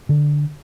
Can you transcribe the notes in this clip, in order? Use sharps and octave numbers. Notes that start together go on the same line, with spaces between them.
D3